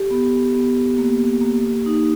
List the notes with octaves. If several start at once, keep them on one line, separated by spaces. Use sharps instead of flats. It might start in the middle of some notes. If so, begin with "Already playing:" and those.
Already playing: G4 A4
B3
B3
A#3
A#3
D#4